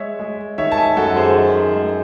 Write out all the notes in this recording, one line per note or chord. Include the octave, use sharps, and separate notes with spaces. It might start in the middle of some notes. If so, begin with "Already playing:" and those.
Already playing: G#3 C#5 E5
G#3
D#3 C#5 E5
A5
E5 G#5
F#2 F#4 A4
G#4 C5
D#3
G#3